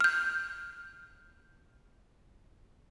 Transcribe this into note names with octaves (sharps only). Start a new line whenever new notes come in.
F6 G6